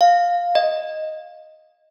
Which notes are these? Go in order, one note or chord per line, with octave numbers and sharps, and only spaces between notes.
F5
D#5